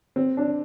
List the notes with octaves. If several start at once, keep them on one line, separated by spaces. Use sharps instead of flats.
C4
D4